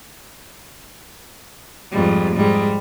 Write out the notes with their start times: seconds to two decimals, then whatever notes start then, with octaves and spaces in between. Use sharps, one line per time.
1.92 F2 G#2 G3
2.36 G#2 G3